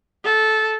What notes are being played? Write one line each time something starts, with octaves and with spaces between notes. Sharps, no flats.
A4